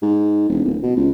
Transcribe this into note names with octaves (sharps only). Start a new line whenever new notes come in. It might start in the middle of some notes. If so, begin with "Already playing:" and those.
G#2
E1
D1
B2
C#2